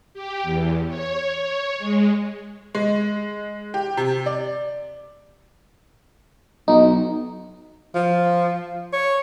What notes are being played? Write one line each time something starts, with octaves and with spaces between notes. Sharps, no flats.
G4
E2
C#5
C#5
G#3
G#3
G4
C3
D5
B1 D#4
F3
C#5